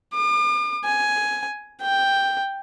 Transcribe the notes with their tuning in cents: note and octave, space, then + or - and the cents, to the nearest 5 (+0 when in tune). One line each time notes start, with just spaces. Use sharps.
D6 +45
G#5 +10
G5 +5